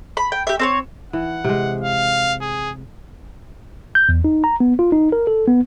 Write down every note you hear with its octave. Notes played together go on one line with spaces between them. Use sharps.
B5
G5
G4 E5
C4 C5 C#5
E3 F#5
C3 G#3
F5
G#4
G6
E2
D#4
A#5
B3
F4
D#4
A#4
A4
B3